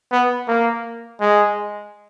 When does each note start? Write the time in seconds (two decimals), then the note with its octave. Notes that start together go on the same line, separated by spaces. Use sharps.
0.12 B3
0.48 A#3
1.21 G#3